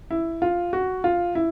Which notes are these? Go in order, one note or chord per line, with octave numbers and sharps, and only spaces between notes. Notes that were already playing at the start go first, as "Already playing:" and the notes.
E4
F4
F#4
F4
E4